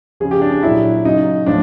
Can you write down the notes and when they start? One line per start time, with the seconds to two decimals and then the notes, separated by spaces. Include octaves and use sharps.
0.20 C#3 F3 G#4
0.31 G4
0.41 D4
0.52 D4
0.63 A#2 F#3 E4
1.05 C#3 F#3 D#4
1.46 A2 F3 D4